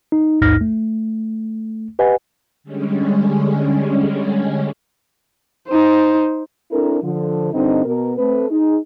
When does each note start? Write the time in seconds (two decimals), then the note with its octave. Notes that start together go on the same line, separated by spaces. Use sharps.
0.12 D#4
0.42 A#1 D#2 G#2 D#4 F6 A#6
0.61 A3
1.99 G4 B4 D#5 F#5 G#5
2.64 D3 G3 G#3 C#4
5.68 D#4 C5
6.72 C4 D4 E4 A4 A#4
7.02 D3 F3
7.53 G2 D3 C4 D#4
7.85 B2 A#4
8.18 A3 C4 B4
8.50 D#4 G#4